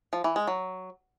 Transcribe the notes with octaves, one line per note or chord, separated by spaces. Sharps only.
F3
E3
G#3
F#3